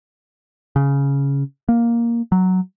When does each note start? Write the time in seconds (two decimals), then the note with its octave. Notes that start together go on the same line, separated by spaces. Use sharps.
0.76 C#3
1.69 A#3
2.32 F#3